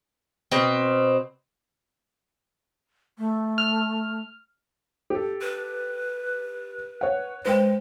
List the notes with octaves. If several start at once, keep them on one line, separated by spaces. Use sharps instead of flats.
B2 C4
A3
F6
G4 A4
B4
C#5 F#5
G#3 B4 C5 G5